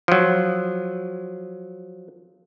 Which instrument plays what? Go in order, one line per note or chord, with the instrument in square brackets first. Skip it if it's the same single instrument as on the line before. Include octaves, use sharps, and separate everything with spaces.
[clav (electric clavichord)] F3 F#3